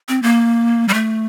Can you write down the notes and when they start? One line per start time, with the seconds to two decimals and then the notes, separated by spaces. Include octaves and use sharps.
0.09 C4
0.22 A#3
0.88 G3
0.94 A3